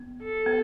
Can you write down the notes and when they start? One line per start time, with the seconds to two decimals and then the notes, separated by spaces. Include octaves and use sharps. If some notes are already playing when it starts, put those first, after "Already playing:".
Already playing: B3
0.23 A4
0.46 B3